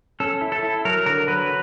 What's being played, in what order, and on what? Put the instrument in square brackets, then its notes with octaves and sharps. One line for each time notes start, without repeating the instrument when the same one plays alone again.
[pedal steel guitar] C#4 A4
E4
A4
E4
F#3 A#4
D3 A#4
F#3 B4